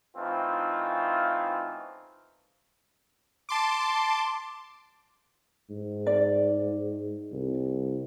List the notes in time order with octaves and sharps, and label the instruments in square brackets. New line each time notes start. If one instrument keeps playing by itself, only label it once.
[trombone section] E3 A3 C4 C#4 D#4 F4
[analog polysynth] A5 C6 D6
[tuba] G#2
[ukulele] D5
[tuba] C2